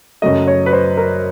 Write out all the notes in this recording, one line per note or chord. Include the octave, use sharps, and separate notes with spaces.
F#2 C#3 F#3 A3 D#5
C#5
B4
C5
A#4